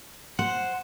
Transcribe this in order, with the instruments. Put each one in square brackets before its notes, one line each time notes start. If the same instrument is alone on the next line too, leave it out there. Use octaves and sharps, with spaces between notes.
[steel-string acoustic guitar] C5 [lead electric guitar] F#5